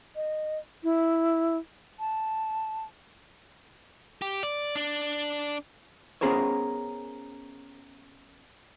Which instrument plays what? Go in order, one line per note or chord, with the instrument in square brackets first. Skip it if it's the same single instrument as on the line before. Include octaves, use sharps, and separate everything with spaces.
[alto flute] D#5
E4
A5
[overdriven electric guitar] G4
D5
D4
[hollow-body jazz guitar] B3 C#4 G#4 A#4 C5 C#5